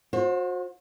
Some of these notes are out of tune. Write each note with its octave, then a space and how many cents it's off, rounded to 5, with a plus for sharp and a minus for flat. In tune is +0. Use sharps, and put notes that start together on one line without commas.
F#4 -35 C5 +25